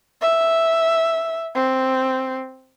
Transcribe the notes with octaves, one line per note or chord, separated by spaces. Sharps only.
E5
C4